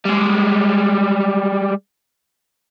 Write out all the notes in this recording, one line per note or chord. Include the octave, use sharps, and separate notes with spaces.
G3 G#3